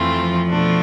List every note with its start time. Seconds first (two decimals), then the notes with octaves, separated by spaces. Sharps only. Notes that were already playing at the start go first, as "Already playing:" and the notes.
Already playing: F2 E3 A3 C4 F4
0.14 F3
0.48 B2 A3 D4 F4